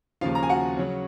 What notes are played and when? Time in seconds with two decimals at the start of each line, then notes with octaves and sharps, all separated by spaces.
0.21 D#2 C#3 F3 F4 F5
0.35 A#5
0.43 G#5
0.49 F#4 F#5
0.77 C#3 F#3 C#4